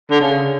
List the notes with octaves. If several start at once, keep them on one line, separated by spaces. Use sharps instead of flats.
D3
C#3